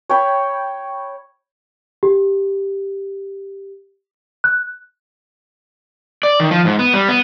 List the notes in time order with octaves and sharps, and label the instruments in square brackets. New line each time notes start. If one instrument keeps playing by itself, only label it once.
[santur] C#5 G5 B5
[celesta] G4
F#6
[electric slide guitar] D5
D#3
F3
G#2
B3
G3
B3